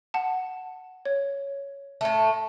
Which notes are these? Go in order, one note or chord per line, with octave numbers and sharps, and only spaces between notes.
F#5 A5
C#5
A2 A3